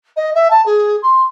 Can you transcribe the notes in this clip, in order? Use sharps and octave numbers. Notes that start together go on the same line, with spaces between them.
D#5
E5
A5
G#4
C6